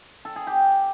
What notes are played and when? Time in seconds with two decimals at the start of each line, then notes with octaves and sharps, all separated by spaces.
0.25 A4
0.36 G#4
0.47 G4